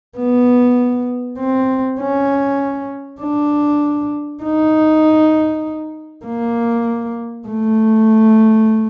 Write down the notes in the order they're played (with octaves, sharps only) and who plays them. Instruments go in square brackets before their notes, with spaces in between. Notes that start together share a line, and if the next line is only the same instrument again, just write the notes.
[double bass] B3
C4
C#4
D4
D#4
A#3
A3